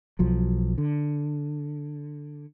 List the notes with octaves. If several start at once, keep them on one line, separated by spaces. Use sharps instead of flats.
B1 F3 F#3
D3